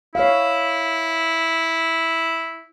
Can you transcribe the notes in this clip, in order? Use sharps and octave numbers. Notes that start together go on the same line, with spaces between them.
E4 C#5 F5